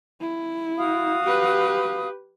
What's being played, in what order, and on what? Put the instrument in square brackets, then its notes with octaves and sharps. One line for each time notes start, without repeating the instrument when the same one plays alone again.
[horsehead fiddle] E4
[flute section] F#4 F5 D#6
[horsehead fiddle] G4 B4